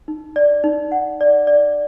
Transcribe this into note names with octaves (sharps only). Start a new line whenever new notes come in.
D#4
D5
D#4
F#5
D5
D5